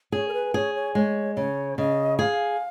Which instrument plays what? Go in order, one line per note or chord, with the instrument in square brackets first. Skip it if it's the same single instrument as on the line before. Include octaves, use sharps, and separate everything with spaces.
[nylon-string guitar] G#4 [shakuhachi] C#5
[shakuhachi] A#4
B4
[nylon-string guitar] G#4 [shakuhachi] C#5
[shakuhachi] C#5
[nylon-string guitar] G#3 [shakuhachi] C#5
[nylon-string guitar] C#3 [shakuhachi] C#5
[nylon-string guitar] C#3 [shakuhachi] D#5
[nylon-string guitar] G#4 [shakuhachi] F5